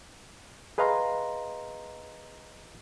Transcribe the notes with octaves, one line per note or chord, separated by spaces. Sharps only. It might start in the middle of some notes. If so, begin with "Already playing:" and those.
G#4 B4 D#5 F5 A#5 C6